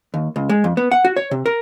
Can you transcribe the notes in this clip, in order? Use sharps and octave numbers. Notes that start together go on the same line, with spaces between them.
D#2
C#2
G#3
F2
B3
F#5
F#4
C#5
C3
A#4